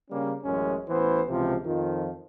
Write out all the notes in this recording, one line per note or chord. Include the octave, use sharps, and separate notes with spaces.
C#3 G3 A#3 C#4
A1 F#2 G#3 C#4
A1 E3 B3 C5
C#2 C3 E3 F3
F2 D#3 F3